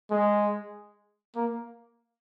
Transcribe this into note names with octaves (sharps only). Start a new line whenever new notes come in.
G#3
A#3